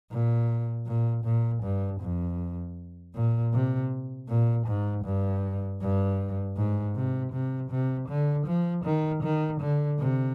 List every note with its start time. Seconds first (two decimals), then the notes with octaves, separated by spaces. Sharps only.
0.11 A#2
0.87 A#2
1.25 A#2
1.63 G2
2.01 F2
3.15 A#2
3.53 C3
4.28 A#2
4.67 G#2
5.05 G2
5.81 G2
6.57 G#2
6.96 C3
7.33 C3
7.71 C3
8.09 D3
8.47 F3
8.85 D#3
9.23 D#3
9.61 D3
9.99 C3